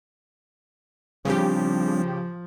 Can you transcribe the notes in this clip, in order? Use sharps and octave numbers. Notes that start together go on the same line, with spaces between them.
C#3 F3 G3 C4 D4 G4